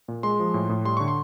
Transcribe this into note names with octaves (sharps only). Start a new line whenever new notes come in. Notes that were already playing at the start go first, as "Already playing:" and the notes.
A#2
G#3 C6
F3
A2
A2
G3 C6
D3 C#6
C6